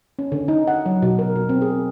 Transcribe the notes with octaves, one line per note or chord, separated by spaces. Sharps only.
C#4
D3
D#4
F#5
F#3
B2
A#4
B2
C4
G#4